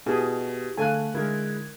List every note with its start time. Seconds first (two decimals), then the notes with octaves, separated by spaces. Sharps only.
0.06 B2 E4 G4 G#4
0.77 D3 A3 A4 F5 G#5 A5 F#6
1.14 D3 G#3 E4 A#4 G#6